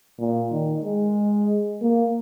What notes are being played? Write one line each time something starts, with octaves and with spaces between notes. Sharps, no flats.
A#2
D#3
G#3
A#3